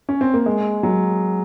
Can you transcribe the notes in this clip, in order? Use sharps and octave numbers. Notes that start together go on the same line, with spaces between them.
C#4
C4
A#3
G#3
F#3